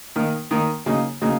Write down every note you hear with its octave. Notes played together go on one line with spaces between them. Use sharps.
D#3 A#3 D#4 A#4
D#3 A#3 D#4 A#4
C#3 F#3 A#3 D#4
C#3 F#3 A#3 D#4